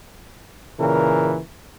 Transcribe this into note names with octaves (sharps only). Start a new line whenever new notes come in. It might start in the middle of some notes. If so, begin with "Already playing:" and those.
A#2 C#3 E3 A#4